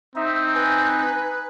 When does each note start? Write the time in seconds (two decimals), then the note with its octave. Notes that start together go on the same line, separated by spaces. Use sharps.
0.16 C4 D#4 E5
0.54 B4 G#5